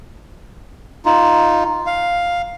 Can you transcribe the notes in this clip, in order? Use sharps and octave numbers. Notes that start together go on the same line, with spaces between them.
D#4 F4
F5